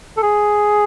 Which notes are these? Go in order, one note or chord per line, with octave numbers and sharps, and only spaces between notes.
A4
G#4